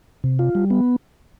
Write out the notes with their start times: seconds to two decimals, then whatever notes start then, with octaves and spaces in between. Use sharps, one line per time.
0.24 C3
0.39 F4
0.55 G3
0.70 B3